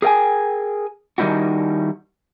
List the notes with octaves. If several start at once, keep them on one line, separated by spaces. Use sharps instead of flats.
G#4 A#4 D5 F5 G5 G#5
D#3 G3 B3 D#4 E4 F#4